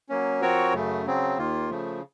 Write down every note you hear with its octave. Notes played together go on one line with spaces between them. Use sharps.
F#3 A#3 C#4
F3 C4 F#4 A#4 C#5
F#2 C#3 A3
C#3 F#3 C4
D#2 D#3 A#3 F4
C#3 F3 A3